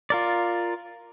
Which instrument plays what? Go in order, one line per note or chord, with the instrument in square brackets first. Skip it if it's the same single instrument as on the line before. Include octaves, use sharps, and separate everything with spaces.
[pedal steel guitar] F4 A#4 D5